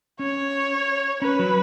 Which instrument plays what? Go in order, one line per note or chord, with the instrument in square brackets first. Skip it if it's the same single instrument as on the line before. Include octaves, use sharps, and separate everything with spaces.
[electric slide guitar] C#4 [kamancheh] C#5
[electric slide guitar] C#4 [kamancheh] B4
[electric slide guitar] F#3